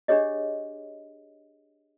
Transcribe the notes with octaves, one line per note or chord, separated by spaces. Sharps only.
D4 G4 G#4 C#5 D#5